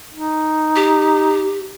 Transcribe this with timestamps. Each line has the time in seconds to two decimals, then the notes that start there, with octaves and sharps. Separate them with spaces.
0.13 D#4
0.76 G4